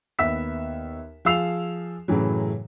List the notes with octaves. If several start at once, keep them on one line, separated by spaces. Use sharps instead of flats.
D#2 B3 E5 E6 B6
F3 G#4 F5 E6 C7 F7
F#2 A2 C#3 E3 F#3